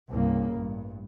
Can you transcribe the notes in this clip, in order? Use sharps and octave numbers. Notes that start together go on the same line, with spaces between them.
C2 G2 C#3 A#3
A1 G2